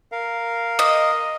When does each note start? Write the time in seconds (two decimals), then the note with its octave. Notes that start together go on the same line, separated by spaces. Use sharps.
0.12 A#4 F5
0.79 D#5